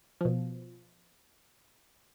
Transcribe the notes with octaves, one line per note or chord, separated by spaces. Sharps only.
B2 F3